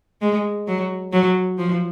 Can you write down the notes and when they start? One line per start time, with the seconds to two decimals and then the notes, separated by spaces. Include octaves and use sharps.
0.21 G#3
0.67 F#3
1.13 F#3
1.58 F3